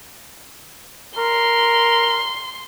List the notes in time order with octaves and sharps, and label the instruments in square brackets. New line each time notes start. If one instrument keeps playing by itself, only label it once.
[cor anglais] A#4 [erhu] C6